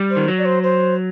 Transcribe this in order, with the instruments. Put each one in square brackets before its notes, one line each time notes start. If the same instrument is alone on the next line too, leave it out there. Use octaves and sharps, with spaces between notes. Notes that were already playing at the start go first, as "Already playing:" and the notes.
Already playing: [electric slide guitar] G3
[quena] C5
[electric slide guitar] D#3
F#3
[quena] D5
C5
C5